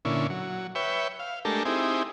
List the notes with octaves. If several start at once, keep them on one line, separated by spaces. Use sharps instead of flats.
A#2 D3 C#4 E4
F#3
B4 C#5 E5 G5
F5
G#3 A3 D4 G4 A4 A#4
C4 D#4 E4 G4 G#4